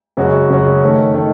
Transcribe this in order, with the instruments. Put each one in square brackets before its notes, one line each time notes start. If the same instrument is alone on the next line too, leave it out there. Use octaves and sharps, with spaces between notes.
[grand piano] F#2 C#3 G#3 C#4 F#4
F#2 C#3 G#3 C#4 F#4
D#3 A3 C#4
D#3 A3 C#4